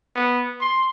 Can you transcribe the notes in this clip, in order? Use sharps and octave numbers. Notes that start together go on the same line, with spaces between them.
B3
C6